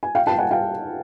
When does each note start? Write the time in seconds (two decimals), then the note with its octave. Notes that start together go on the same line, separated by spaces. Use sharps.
0.03 G#5
0.15 F5 G5
0.27 G5 A5
0.38 F#5 G#5
0.51 F5 G5